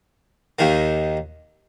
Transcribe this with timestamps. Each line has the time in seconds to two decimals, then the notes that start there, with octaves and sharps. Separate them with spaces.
0.59 D#2 D#3 A#3